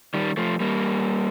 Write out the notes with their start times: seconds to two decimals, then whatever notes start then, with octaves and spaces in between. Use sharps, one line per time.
0.14 D#3 G3
0.37 F3 A3
0.60 G3 A#3